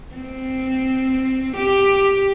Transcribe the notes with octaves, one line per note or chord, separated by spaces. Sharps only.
C4
G4